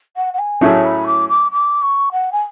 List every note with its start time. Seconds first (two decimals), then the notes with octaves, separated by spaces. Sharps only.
0.16 F#5
0.34 F#5
0.39 G#5
0.61 A2 F#3 A3 C#4 G#4 A5
0.84 B5
1.06 D6
1.29 D6
1.52 D6
1.82 C#6
2.12 F#5
2.32 G#5